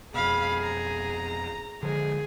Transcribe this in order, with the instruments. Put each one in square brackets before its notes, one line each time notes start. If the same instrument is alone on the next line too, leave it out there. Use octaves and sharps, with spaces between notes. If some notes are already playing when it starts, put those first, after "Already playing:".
[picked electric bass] F2 B2 [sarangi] G#4 [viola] F5 B5
[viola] A#5
[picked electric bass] D3 F3 G#3 [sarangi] G#4